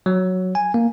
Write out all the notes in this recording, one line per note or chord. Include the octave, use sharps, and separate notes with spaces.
F#3
G#5
A#3